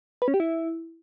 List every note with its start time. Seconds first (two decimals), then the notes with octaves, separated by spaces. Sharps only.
0.22 B4
0.28 C#4
0.34 G4
0.40 E4